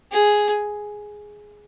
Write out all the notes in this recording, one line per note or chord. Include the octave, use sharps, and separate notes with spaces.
G#4